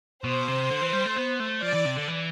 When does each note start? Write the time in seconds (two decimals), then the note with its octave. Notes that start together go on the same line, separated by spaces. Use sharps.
0.24 B2 C5
0.48 C3
0.70 D3
0.81 E3
0.93 G3
1.05 A3
1.16 B3
1.40 A3
1.62 F3 D5
1.74 E3
1.86 C3
1.97 D3
2.08 E3